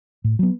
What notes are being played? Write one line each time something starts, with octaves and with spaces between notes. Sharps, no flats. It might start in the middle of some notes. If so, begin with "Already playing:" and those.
A2
F#3 B3